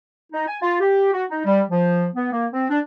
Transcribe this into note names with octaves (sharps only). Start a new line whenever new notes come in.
D#4
G#5
F4
G4
F#4
D#4
G3
F3
B3
A#3
C4
D4